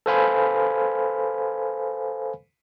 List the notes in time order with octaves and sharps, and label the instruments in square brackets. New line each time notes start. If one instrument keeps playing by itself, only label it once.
[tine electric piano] A4 B4 C5 F5 G#5 B5